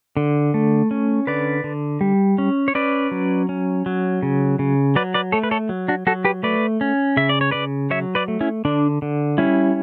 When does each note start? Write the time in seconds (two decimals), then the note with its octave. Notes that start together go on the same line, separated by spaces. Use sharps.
0.17 D3
0.54 A3
0.91 C#4
1.27 D3 B4 D5
1.64 D3
2.01 G3
2.38 C#4
2.68 C#5
2.75 C#4 B4 D5
3.11 F#3
3.49 C#4
3.86 F#3
4.23 C#3
4.59 C#3
4.96 F#3 B4 D5
5.14 B4 D5
5.32 A3 A4 C#5
5.43 B4
5.51 A4 C#5
5.69 F#3
5.88 D4 F#4
6.07 F#3 F#4 A4
6.25 G4 B4
6.43 A3 B4 D5
6.81 C#4
7.17 C#3 E5
7.29 D5
7.41 C#5
7.51 C#3 B4 D5
7.90 F#3 C#5 E5
8.15 B4 D5
8.28 A3
8.41 C#4 E4
8.65 D3 D4
9.02 D3
9.38 G3 C#4 E4